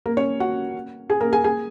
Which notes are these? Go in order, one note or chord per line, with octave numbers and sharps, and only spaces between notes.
A#3 A#4
C#4 C#5
F#4 F#5
G#4 G#5
A#3 A#4
G#4 G#5
G#4 G#5